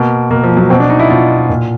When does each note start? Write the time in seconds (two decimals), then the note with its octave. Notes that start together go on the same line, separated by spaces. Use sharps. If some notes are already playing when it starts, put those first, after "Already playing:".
Already playing: B2 A#3
0.30 B2 A#3
0.44 F3
0.57 F#3
0.70 B2 C4
0.80 D4
0.90 D#4
0.99 E4
1.10 B2 F4
1.49 A#2